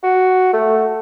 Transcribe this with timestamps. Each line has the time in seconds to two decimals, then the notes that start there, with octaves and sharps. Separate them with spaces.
0.03 F#4
0.53 A3